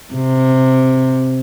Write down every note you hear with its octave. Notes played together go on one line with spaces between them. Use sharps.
C3